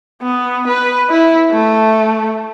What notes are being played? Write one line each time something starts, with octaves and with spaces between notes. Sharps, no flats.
B3
B4
E4
A3